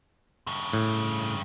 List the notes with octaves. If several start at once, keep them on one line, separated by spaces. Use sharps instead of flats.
G2 C#3
A2